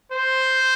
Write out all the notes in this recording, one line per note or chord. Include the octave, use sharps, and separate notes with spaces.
C5